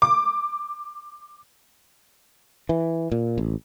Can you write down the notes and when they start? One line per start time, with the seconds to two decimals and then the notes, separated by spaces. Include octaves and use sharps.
0.02 D6
2.69 E3
3.12 A#2
3.38 A1